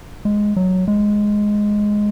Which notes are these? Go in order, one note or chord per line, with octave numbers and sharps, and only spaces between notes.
G#3
F#3
G#3